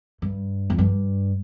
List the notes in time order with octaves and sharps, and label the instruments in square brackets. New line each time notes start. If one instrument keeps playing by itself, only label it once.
[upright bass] G2
F2
G2